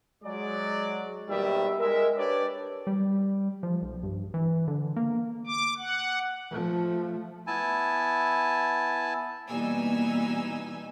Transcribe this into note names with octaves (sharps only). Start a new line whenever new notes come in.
F#3 G#3 D5
D#2 B2 D#3 G3 E5
G#3 A#4 E5
D4 G4 B4 C#5 D5
G3
F3
B1
G2
E3
D3
A#3
D6
F#5
F3 A3
B3 E4 G#5 A5
B2 E3 G3 A#3 D#4 G#5 E6